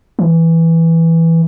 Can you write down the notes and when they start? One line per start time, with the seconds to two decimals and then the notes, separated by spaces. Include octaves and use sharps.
0.19 E3